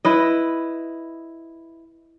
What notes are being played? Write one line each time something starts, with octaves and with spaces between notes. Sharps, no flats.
E4 B4 D#5